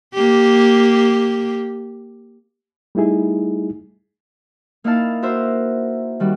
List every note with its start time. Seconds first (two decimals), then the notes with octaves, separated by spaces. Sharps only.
0.14 A#3 G4
2.95 G3 A3 D#4 E4 G#4
4.84 A#3 D#4 E4 F5 A5
5.22 F#4 A#4 C5 E5
6.20 D#3 G3 F#4